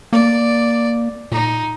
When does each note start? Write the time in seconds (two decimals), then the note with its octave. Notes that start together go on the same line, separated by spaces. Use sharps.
0.13 A#3 D5
1.32 A#2 D#4